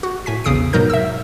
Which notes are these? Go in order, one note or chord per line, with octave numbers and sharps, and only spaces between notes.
F#4
A2 G#5 B6
A#1 E2 C#3 D#6 C7 D7
G#2 B2 F#3 D#4 A#4 G6
E5 E6